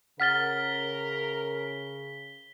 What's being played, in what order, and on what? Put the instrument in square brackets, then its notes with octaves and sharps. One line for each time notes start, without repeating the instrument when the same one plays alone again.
[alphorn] C#3 [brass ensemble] A#4 [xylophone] F#5 F6 A6 [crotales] B6 G7